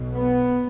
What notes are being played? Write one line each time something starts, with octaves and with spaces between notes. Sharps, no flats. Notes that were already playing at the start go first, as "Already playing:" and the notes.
Already playing: B1 B2
B3